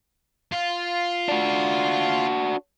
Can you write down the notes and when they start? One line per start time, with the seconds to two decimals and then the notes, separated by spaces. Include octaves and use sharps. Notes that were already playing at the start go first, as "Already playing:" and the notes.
0.52 F4
1.28 D4 F#4